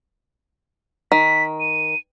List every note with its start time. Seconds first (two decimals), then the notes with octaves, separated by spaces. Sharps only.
1.12 D#3 B6
1.60 D#7